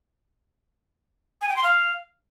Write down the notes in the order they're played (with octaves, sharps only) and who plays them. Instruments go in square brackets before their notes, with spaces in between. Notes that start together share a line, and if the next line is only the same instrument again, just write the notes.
[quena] G#5
G5
C6
F5